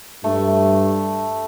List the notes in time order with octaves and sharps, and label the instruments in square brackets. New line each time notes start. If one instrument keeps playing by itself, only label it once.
[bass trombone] G2 [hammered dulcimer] A3